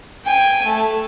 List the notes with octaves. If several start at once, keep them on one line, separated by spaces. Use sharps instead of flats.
G5 G#5
A3